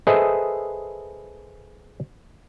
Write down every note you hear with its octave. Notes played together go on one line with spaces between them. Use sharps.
G#4 A4 B4 C5 D#5 E5